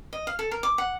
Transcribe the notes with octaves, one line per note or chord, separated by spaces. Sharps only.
D#5
F5
A4
A#4
D6
F#5